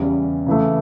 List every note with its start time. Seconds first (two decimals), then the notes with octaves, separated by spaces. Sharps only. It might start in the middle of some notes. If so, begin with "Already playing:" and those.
Already playing: E2 C#3 G3 C#4
0.46 C#3 E3 A3